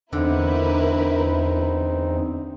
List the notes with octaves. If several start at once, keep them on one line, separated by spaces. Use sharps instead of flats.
E2 D3 C4 D#4 E4 A#4 B4